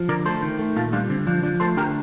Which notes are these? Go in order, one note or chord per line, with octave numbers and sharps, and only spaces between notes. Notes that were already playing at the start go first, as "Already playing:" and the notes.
Already playing: F3
D3 A#4 D5
A3 A4 C5
D#3
A3
A#2 F4 A4
G3 D4 F4
D3 C4
F3 D4
F3 D4
A3 A4 C5
D3 G4 A#4